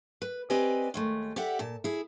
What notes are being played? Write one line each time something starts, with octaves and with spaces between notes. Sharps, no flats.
B4
C4 G4 B4 D5 D#5 G#5
D#2 G#3 A3
G4 A4 D5 E5 F#5
A#2 A5
E4 G#4